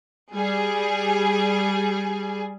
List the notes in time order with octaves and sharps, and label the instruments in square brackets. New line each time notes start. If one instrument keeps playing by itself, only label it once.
[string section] G3 G#4